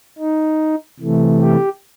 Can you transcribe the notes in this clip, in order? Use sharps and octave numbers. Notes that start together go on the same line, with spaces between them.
D#4
C3 E3 A3
G4